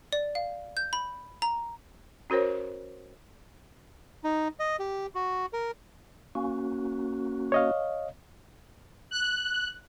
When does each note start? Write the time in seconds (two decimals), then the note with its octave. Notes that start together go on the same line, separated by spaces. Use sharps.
0.13 D5
0.35 F5
0.77 G6
0.93 B5
1.42 A#5
2.30 C#4 F#4 A#4 C5 C#5
4.24 D#4
4.59 D#5
4.79 G4
5.15 F#4
5.53 A#4
6.35 A#3 C#4 F#4
7.52 C#5 D#5 F5
9.11 F#6